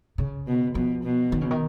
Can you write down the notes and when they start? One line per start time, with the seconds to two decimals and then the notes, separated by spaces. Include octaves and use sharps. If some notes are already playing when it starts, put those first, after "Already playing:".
0.18 C#3
0.48 B2
0.75 B2 F3
1.04 B2
1.32 D#3
1.41 C#3
1.51 D#3